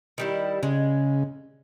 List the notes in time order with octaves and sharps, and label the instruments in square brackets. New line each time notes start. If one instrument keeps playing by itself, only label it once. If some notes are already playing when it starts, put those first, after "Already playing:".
[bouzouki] D#3 G3 E4
[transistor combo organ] C#3 [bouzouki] G#3